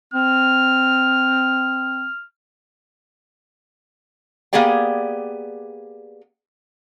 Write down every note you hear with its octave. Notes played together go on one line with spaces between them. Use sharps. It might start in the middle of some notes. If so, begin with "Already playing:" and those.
C4 F6
A#3 B3 G4 G#4 D5 G5